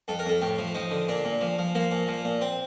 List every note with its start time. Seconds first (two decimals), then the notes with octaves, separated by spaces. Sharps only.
0.08 F2 A4
0.19 A#4
0.25 F2 A4
0.42 A2 G4
0.58 F3
0.74 F3 D#4
0.91 D3
1.08 A#2 D4
1.25 A#2
1.41 F3
1.58 F3
1.75 F3 A#3
1.92 A#2
2.08 F3
2.24 A#2
2.41 C4